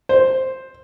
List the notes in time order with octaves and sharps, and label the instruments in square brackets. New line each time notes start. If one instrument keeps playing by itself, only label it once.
[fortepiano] C5